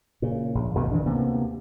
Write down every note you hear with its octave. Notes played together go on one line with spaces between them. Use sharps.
A#2 C#3
A#1
G#1 G2 B2 D#3
D#3 E3 D4
D2 C3 A#3 B3